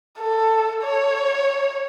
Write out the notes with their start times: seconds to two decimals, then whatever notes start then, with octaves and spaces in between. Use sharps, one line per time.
0.19 A4
0.83 C#5